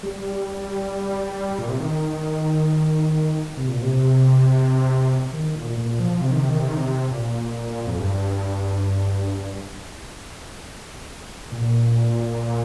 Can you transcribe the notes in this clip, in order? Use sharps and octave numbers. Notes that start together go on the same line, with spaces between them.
G3
A#2
C3
D#3
C3
A#2
C3
D#3
A#2
A#2
F3
C3
D#3
C3
D#3
C3
D#3
C3
A#2
F2
G2
A#2